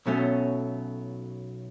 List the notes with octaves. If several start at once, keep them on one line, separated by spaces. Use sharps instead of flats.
B1 B2 F#3 A3 C#4